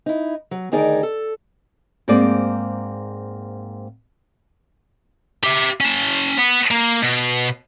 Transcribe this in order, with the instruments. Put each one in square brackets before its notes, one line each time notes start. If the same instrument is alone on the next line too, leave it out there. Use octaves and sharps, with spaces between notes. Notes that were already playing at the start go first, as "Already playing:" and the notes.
[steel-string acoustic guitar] D#4 E4
F#3
D2 D#3 D#4 G#4 A#4 D5
A4
[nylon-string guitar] G#2 A#3 C4 G#4 D5
[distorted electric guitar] G4 E5
C#4 A5
B3
A#3
B2